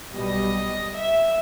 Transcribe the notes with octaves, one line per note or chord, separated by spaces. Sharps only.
B1 B2 G3 D#5
E5